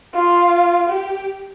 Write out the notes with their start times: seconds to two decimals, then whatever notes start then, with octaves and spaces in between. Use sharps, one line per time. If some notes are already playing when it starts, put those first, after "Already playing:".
0.14 F4
0.89 G4